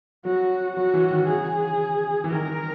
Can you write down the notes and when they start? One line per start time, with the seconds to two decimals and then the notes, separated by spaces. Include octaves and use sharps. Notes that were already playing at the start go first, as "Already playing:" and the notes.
0.25 F#3 F#4
0.76 F#3 F#4
0.94 E3
1.11 D#3
1.28 C#3 G#4
2.24 E3
2.32 D#3 A#4